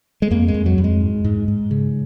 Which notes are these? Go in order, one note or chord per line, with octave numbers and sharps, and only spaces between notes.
G#3
F2 A#3
G#3
F2
F#3
F2
G#3
G#2
G#2
G#2
C#3